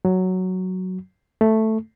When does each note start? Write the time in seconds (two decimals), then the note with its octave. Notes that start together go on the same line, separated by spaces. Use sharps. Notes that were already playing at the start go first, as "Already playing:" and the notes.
0.05 F#3
1.41 A3